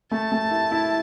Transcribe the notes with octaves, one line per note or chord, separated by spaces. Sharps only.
A3 A5
A3
E4
E4